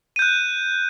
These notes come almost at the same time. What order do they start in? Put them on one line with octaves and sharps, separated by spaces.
D#7 G6 F#6